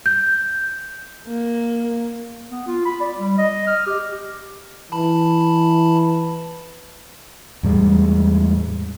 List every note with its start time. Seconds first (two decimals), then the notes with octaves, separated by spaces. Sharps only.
0.06 G6
1.28 A#3
2.51 B3
2.67 F4
2.86 B5
3.00 D5
3.18 G3
3.38 D#5
3.67 F6
3.87 G4
4.92 E3 A5 B5
7.63 E2 A2 G3 G#3